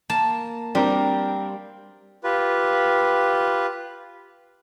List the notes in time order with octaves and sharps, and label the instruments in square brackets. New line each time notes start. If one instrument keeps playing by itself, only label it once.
[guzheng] A#3 A5
[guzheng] G3 [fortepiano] C4 D4 A#4
[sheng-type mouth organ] F4 G4 B4